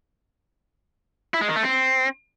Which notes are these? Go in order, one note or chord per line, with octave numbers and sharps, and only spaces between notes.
E4
G#3
D#3
A3
C4